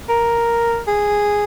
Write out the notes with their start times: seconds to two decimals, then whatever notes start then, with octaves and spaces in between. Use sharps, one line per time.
0.09 A#4
0.87 G#4